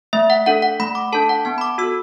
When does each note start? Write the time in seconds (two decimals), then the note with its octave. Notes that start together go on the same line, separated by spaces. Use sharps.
0.13 A3 E5
0.30 F#5
0.46 D4 A4 F#5
0.62 F#5
0.80 A3 B5
0.95 D6
1.12 D4 A4 A5
1.29 F#5
1.45 B3 A5
1.58 B5
1.61 D6
1.78 F#4 A4 E6